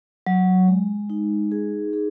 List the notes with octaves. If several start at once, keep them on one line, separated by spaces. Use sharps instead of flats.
F#3
G#3
D#4
G#4
G#4